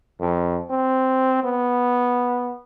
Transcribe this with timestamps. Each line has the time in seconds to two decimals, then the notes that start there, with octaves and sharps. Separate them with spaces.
0.20 F2
0.70 C4
1.43 B3